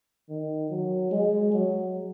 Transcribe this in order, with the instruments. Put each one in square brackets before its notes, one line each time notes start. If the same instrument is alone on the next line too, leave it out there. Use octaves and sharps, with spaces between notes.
[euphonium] D#3
F#3
G#3
F#3